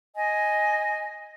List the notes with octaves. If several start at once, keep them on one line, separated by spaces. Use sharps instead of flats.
D#5 G#5